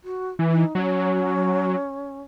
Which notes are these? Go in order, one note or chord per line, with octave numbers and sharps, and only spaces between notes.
F#4
E3
D#4
F#3 C#4 D#4